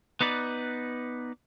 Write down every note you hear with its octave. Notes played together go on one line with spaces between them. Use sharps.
B3 D#4 B4 D5